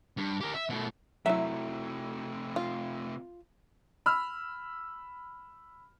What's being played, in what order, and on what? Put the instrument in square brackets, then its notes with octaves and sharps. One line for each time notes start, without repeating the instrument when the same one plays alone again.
[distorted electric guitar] G2
G4 A#4
E5
B2 A3
[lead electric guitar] C3 A3 [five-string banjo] F#3 E4 [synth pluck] E5
[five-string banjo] F4
[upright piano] B5 E6 F6